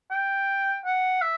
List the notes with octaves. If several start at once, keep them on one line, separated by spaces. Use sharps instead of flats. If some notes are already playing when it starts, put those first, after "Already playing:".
G5
F#5
E5